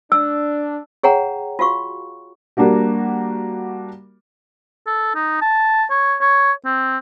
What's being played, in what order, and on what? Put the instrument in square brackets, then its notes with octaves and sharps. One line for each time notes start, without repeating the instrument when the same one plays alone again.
[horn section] D4 [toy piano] E6
[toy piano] G#4 C#5 F#5 G5 A#5
F4 F#4 F5 C#6
[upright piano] G3 A#3 D4 F#4 G4
[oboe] A4
D#4
A5
C#5
C#5
C4